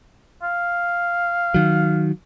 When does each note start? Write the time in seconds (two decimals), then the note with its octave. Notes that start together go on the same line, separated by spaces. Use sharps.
0.43 F5
1.54 D#3 F#3